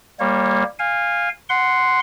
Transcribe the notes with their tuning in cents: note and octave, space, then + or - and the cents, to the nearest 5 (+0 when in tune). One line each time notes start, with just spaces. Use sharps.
G3 +10 A#3 +0 C#5 -30
F5 +0 G#5 -25
F#5 +0 C6 -5